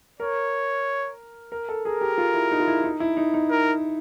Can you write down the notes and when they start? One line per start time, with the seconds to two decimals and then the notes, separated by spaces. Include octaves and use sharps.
0.20 A#4 C#5
1.52 A#4
1.69 A4
1.85 G#4 A#4
2.01 G4
2.18 F4
2.34 E4
2.51 D#4
2.60 F4
2.68 E4
2.84 D#4
3.00 E4
3.17 D#4
3.34 D#4
3.50 A#4